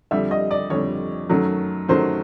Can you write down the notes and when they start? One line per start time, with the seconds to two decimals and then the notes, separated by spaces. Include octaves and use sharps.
0.11 F2 D3 G3 E5
0.31 D#5
0.51 D5
0.70 F2 D3 G3 C#5
1.29 F#2 D#3 F#3 A3
1.89 F#2 D#3 F#3 A3 C5